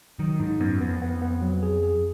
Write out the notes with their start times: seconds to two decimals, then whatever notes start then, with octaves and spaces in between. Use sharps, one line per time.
0.19 D#3 F#3
0.40 G#2 D#4
0.60 F#2 B3
0.81 F2 B3
1.02 B3
1.22 B3
1.42 F#3
1.63 G#4
1.83 G#4